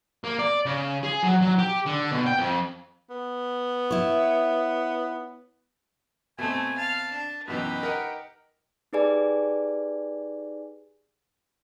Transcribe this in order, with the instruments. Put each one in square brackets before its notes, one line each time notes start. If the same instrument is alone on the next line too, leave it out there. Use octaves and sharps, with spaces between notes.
[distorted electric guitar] A#3
D5
C#3
G#4
F#3
F#3
G4
D3
B2
G5
F2
[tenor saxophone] B3
[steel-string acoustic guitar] E4 C#5
[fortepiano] B2 C4 [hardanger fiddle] A3 [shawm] G#5
[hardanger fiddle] F5 [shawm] A5
[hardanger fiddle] D4
[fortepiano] F#2 B2 E3 [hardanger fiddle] D#4 G4 [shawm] B4
[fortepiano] A#4 D#5 F#5
[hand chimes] D#4 G4 G#4 B4 D5 G#5